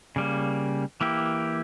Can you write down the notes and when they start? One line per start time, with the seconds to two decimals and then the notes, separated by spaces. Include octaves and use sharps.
0.16 C#3 G3 A#3
1.01 E3 A#3 E4 G4